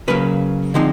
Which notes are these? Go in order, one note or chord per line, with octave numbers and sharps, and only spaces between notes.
C#3 F#3 A#3 B4
D3 F3 G#3 C4 D#4